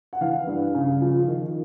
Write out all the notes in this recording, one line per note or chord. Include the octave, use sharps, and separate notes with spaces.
F#5
E3 F5
G2
C#3
F3
D#3